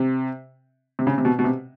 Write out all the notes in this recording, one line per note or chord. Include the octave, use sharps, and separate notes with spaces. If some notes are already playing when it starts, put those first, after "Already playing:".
Already playing: C3
C3
C#3
C3
B2
B2
C3